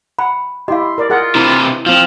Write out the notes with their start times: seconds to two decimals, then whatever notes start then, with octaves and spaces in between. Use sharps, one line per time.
0.19 F#5 B5
0.68 E4 G4 D#5 F5 C6
0.98 A#4 D5
1.10 F4 G#4 A#4 F#5
1.35 C3 E3 E4
1.86 F3 C4 F4 F5